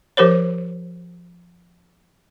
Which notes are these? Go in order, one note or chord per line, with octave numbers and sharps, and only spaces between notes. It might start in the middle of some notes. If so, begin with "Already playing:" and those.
F3 G4 A#4 C5 C#5